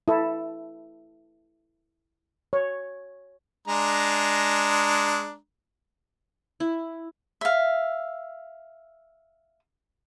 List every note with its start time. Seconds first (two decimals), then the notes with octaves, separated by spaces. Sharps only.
0.08 E4 A4
2.53 C#5
3.68 G#3 D4 A#5
6.60 E4
7.41 E5 F5